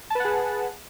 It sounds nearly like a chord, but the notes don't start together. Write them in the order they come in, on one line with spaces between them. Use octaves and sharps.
A5 B4 F#5 G#4